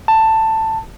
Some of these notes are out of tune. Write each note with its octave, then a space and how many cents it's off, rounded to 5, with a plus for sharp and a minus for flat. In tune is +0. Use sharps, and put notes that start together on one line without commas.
A5 +10